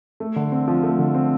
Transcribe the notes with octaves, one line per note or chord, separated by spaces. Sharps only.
A3
D3
C4
F3
A3
D3
C4